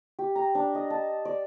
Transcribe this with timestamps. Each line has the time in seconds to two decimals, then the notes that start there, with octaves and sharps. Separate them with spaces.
0.19 G4
0.35 A#5
0.55 D4
0.75 D#5
0.90 A5
1.25 D5